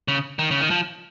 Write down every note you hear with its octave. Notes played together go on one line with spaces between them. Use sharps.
C#3
D#3
C#3
D#3
F3